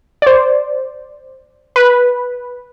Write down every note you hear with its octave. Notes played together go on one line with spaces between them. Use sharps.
C5 D5
B4